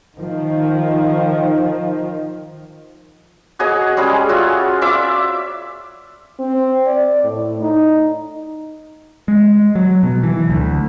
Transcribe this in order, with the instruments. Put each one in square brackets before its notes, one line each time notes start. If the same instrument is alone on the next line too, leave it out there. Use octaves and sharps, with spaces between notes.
[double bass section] D#3 F3
[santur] F#4 G#4 C#5 D#5
G3 G#3 C#4 G#4
F4 F#4 C#5 E5
F4 D5 E5 D6
[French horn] C4
D5
A2
D#4
[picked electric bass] G#3
F#3
B2
E3
D2